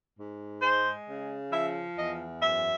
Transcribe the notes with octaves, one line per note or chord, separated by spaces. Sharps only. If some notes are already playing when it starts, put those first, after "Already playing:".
G#2
G#3 C5
C#3
F3 E5
E2 D#5
F#2 E5